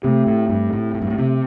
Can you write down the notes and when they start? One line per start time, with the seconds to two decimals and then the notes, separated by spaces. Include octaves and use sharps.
0.03 C3 A3 C4 G4
0.27 A2
0.49 G2
0.73 A2
0.94 A2
1.02 G2
1.10 A2
1.18 C3